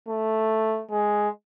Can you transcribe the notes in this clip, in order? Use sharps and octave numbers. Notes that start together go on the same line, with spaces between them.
A3
G#3